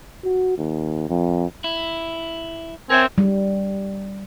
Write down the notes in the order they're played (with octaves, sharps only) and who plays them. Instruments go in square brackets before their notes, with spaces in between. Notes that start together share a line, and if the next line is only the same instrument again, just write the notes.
[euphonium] F#4
D#2
F2
[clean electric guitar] E4
[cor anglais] C4 [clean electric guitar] A#4 C#5 E5 [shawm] G#5
[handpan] G3